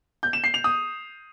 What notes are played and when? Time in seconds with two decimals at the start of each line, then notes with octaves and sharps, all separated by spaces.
0.23 G6
0.33 E7
0.44 C7
0.54 F7
0.64 D#6